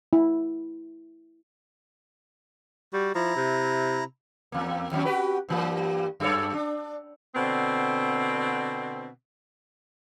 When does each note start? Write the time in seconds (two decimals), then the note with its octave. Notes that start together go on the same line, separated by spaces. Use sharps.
0.13 E4
2.93 G3 F#4
3.15 F3 E4 A#5
3.36 C3
4.52 E2 A#3
4.91 D#2 F#3 C#4
5.05 F#4 G4 B4
5.49 G2 E3 A#3
6.20 F#2 A4 C#5
6.53 D4
7.35 B2 D3 C4